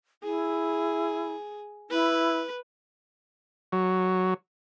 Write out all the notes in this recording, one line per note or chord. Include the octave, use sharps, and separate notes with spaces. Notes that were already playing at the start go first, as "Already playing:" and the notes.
E4 G#4
E4 B4
F#3